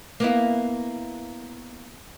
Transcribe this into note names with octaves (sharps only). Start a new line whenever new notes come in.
A#3 B3 E4